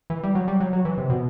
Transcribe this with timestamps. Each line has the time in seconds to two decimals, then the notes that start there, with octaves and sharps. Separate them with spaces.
0.10 E3
0.23 G3
0.35 F#3
0.48 G3
0.60 F#3
0.73 F#3
0.85 E3
0.98 C3
1.10 B2